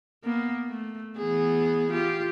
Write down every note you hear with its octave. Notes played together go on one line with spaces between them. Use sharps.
A#3 B3
A3
E3 B3 G#4
F4 G4